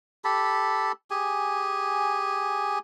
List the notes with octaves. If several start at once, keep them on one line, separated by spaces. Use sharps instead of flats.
G4 A4 A5 B5
G4 G#4 G#5